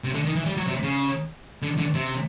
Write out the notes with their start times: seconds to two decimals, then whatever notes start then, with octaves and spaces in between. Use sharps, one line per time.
0.04 C3
0.14 D3
0.25 D#3
0.36 E3
0.46 G3
0.57 F#3
0.67 C3
0.83 C#3
1.62 D3
1.78 D3
1.94 C3